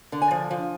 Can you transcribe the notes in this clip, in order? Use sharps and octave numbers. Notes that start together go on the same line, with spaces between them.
D3
G#5
F3
F3